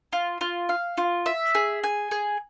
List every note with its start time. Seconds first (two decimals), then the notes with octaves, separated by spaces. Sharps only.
0.13 F4
0.41 F4
0.69 F5
0.98 F4
1.26 E5
1.55 G#4
1.84 G#5
2.11 G#4